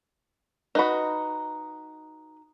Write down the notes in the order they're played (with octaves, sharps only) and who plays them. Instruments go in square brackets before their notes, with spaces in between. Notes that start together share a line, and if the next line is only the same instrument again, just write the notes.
[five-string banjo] D#4 F#4 [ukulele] B4 D#5 B5